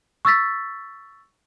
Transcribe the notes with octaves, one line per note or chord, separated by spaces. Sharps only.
C#6 E6 A6 B6